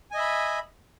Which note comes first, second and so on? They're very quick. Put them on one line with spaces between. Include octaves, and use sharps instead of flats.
G#5 D#5 E5 B5